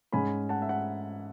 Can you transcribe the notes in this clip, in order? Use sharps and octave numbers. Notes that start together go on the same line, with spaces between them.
G#2 G#3 C#4 G#5 B5
F#5 A5
E5
F#5